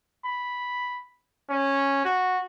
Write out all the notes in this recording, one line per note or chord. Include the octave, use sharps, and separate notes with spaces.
B5
C#4
F#4